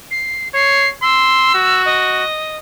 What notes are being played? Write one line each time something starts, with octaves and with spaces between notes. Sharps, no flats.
C7
C#5 C7
C6 E6
F#4
D#5